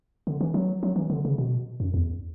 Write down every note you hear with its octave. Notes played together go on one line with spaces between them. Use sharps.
D3
E3
F#3
F#3
E3
D3
C#3
B2
F#2
E2